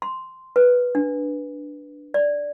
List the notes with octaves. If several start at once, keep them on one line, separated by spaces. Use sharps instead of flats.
C6
B4
D4
D5